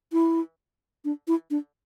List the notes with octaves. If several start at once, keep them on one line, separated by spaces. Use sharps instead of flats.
E4
D4
E4
D4